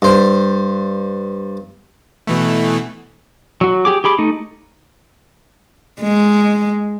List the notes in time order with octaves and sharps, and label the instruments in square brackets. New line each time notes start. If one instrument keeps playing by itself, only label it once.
[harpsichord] G2 C5
[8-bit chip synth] B2 E3 A3
[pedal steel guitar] F#3 F#4
G4 G#4 D6
G4 G#4 B5 D6
A3 D#4
[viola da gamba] G#3